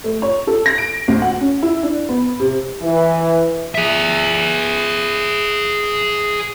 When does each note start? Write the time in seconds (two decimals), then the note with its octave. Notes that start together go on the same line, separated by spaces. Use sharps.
0.04 A3
0.22 C#5
0.47 A4
0.66 A#6
0.78 D7
1.08 D2
1.22 F#5
1.41 C#4
1.63 E4
1.83 D4
2.09 B3
2.39 C3
2.81 E3
3.75 G#4 E5